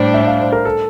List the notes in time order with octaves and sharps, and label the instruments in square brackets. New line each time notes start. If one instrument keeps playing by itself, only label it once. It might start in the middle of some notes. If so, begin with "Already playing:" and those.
Already playing: [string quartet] A2 G3 D4 [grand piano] C5
[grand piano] E5
F5
C5
A#4
A4